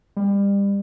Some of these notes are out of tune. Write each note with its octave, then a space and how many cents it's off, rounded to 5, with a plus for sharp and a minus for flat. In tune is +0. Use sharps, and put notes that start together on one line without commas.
G3 +30